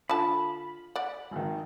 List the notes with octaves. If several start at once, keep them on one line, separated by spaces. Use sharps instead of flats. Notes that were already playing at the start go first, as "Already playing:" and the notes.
D3 F4 A5 B5
D5 F#5
G#1 D#3